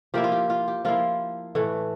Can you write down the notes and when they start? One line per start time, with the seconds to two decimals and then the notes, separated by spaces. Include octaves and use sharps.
0.14 F3 A#3 E4 G4
0.24 F4
0.32 G4
0.50 F4
0.68 G4
0.85 F3 A#3 E4 F4
1.55 A2 E3 A3